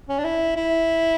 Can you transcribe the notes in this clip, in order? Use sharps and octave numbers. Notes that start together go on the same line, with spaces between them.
C#4
D4
E4
E4